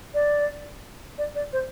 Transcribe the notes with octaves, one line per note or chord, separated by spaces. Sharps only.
D5
D5
D5
C5